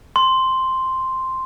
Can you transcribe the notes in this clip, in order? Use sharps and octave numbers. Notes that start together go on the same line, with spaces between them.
C6